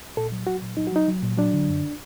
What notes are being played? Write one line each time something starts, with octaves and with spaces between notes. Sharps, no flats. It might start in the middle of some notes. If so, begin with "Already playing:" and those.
A#2 A4
F#3
F#3 F#4
A#2
F#3 D#4
F#4
F#3 D#4
F#3
A#2
F#3 D4
D3
F#2